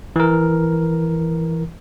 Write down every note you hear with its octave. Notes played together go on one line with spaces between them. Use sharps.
E3 A#4